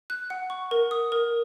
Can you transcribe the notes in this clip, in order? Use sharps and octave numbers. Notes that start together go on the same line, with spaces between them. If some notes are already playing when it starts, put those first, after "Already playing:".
F#6
F#5
C#6
A#4
D#6
A#4